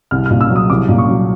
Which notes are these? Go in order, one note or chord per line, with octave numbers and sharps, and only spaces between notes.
C2 F6
A#2 F6
E6
F#3
D#6
C2 D6
A#2
C#6
F#3